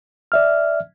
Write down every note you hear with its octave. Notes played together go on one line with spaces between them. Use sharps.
D5 E5 F6